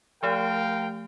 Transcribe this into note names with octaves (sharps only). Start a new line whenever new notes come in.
F3 A3 G4 A#4 F5 G5